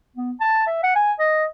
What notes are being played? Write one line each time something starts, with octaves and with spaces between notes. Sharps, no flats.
B3
A5
E5
F#5
G#5
D#5